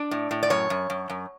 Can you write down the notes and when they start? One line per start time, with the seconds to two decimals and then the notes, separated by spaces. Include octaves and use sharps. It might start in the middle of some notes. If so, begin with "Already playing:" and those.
Already playing: D4 D5
0.11 A2
0.31 A2
0.43 D5
0.50 F#2 C#5
0.70 F#2
0.90 F#2
1.10 F#2